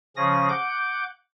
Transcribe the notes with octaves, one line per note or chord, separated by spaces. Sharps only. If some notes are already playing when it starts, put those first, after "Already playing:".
C#3 F3 C#4 G#4 D#6 A#6
F#5 D6 G6